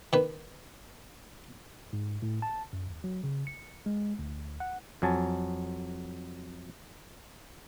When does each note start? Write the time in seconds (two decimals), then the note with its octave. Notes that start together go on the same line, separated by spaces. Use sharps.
0.13 D#3 B4
1.93 G#2
2.22 A2
2.42 A5
2.73 F#2
2.86 D#2
3.04 F#3
3.24 C#3
3.47 C#7
3.86 G#3
4.19 D2
4.60 F#5
5.02 F2 F#3 G#5 A5